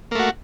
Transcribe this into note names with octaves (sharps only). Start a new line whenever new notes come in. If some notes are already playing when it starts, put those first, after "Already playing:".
A3 A#3 F#4